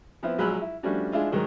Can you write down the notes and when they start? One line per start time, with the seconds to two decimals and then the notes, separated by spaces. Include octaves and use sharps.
0.23 F3 B3 C4 E4
0.38 A#1 F#3 G#3 B5 E6 F#6
0.61 E4
0.83 F3 G3 A3 C#4 D4 F#4
1.12 G#3 D4 E4 F4
1.31 G#2 D#3 F#3 G#3 D#4